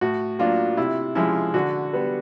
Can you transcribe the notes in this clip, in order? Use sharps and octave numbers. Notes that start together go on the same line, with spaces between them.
A2 F#4
F#3 A#3 D4 F4
C3 E4
F3 G#3 C#4 E4
D3 F#4
G3 B3